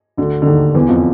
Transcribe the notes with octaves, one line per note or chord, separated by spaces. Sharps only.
D2 D3
D3
D#2 D#3
E2 E3
F2 F3